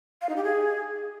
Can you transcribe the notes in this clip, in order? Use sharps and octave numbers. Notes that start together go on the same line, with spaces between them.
F5
D#4
G4
G#4